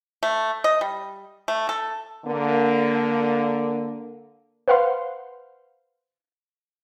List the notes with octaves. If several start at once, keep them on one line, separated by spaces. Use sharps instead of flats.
A3
D#5
G3
A3
A4
D3 A#3
B4 C5 F5 F#5 C6